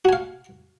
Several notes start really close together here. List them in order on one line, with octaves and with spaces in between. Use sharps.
F#4 G#5 F5